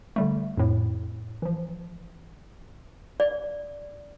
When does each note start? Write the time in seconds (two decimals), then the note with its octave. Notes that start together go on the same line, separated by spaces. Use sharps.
0.16 D3 G3 A3
0.57 F2 A2
1.42 E3 F3
3.20 D5